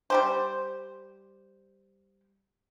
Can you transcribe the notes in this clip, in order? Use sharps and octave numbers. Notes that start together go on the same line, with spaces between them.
G3 G4 C5